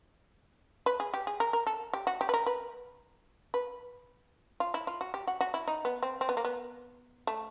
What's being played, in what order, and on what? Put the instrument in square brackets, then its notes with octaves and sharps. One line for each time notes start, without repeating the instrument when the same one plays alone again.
[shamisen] B4
G#4
G4
G#4
A#4
A#4
A4
G4
F#4
G4
B4
A#4
B4
B4
F4
E4
F4
F#4
G4
F#4
F#4
E4
D#4
B3
C4
C4
B3
A#3
B3
A3